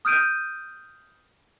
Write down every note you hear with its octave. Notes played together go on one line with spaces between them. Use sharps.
D#6 F6 G6 D7 D#7